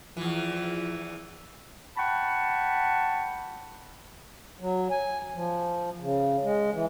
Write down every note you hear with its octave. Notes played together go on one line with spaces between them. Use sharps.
E2 E3 F3
F#5 G5 A5 B5 C#6
F#3
G#5
F3
C#3
G#3
E3